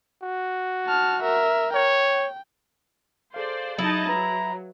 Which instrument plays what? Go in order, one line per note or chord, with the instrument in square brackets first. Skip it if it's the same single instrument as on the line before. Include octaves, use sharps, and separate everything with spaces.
[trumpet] F#4
[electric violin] A5 F6
A#4 E5
[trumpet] C#5 [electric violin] G5
[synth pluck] G#4 A4 F5 [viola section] C5 D5
[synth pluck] F#3 [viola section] D#4 D#5 A5 [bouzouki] E4
[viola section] F#3 [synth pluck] B4 [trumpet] A#5